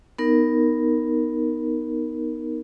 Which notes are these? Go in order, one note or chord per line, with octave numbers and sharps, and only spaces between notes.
B3 D#4 A#4